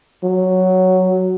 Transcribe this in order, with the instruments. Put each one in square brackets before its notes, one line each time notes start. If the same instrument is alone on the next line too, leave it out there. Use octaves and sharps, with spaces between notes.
[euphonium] F#3